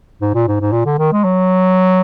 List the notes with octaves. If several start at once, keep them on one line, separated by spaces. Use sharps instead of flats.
G#2
A#2
G#2
G#2
A#2
D3
D#3
G#3
F#3